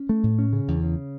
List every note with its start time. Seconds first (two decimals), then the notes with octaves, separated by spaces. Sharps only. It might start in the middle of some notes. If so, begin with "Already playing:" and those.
Already playing: C#4
0.09 A3
0.23 A2
0.39 C#4
0.53 C#3
0.68 E2
0.83 C#3